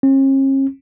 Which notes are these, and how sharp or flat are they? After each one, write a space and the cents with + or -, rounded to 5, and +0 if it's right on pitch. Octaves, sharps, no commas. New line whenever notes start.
C#4 -45